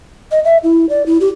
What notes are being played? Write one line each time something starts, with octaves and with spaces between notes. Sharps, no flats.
D#5
E5
E4
D5
E4
G4